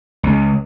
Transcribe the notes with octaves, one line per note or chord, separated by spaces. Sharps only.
C#2